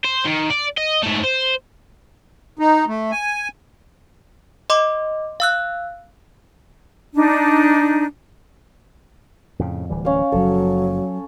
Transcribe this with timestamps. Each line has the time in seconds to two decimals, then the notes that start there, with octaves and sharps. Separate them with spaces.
0.05 C5
0.25 D#3
0.50 D5
0.78 D#5
1.03 G#2 A3
1.24 C5
2.59 D#4
2.88 A3
3.11 G#5
4.70 D#5 C6 D6
5.40 F5 E6 F#6
7.14 D4 D#4
9.59 F2 A2 C#3
9.90 D1 E3 G3
10.05 C#4 F5
10.32 F#1 F3 F#3 A4